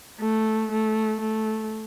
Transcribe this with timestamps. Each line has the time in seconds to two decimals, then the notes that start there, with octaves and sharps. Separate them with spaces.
0.20 A3
0.72 A3
1.21 A3